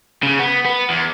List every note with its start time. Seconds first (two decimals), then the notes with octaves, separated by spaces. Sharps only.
0.23 C#3
0.39 B3
0.66 B3
0.90 E2